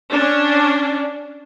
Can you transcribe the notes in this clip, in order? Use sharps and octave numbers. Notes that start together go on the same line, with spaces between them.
C#4 D4